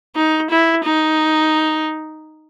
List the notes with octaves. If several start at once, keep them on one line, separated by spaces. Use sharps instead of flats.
D#4
E4
D#4